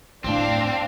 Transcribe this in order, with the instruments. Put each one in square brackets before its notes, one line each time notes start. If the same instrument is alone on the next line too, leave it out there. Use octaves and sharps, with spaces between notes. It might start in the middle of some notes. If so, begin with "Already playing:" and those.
[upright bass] E2 A2 [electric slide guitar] C4 [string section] D4 F5